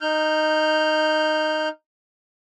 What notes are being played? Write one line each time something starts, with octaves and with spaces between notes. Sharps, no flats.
D#4 F6 G6